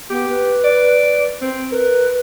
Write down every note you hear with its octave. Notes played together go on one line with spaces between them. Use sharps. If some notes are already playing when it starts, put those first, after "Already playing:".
B3 G4
B4
D5
C4
A#4 B4